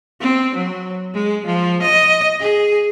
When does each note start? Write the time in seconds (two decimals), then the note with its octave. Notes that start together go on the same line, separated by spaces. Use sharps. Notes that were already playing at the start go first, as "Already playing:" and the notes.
0.20 C4
0.55 F#3
1.14 G#3
1.46 F3
1.82 D#5
2.40 G#4